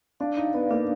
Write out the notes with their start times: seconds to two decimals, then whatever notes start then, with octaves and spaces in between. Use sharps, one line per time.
0.20 D4 F5
0.37 D#4 F5
0.54 B3 D5
0.71 A#3 D4